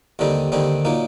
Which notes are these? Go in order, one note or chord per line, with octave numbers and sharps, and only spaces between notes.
D#2 D3 G3 C4 D#4
D#2 D3 G3 C4 D#4
A#2 F#3 A#3 D#4